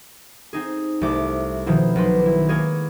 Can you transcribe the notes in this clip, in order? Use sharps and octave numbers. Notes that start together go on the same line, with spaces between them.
C4 D#4 G#4
C2 G3 A3 D6
B2 D#3 F3 C4 E4
B1 B4 C6
E4
G#3 A#3 G#4 C#5